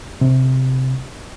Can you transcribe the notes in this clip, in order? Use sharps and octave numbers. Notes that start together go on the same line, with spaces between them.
C3